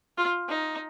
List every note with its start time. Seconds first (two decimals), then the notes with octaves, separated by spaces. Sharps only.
0.18 F4
0.49 D#4